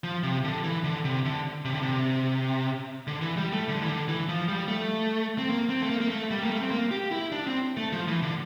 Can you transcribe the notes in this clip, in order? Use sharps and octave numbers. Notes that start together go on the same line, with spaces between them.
F3
C3
D3
E3
D3
C3
D3
C3
D3
C3
D3
E3
G3
A3
D3
E3
D3
E3
F3
G3
A3
C4
A#3
C4
A3
A#3
A#3
A3
G3
A#3
A3
C4
A#3
G4
E4
D4
C4
A3
F3
E3
D3